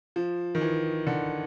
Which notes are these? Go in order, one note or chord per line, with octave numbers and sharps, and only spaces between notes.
F3
D#3
E3
D3